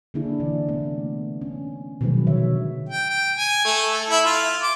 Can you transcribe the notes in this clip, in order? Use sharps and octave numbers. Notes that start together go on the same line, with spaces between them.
D3 A#3 D4 E4 G#4
C3 E3 D5
A3 B3
C#4
B2 D#3 F3 F#3 G#3 B4
D3 C#5 E5
G5
G5
G#5
A3
A4
E4
F4
D6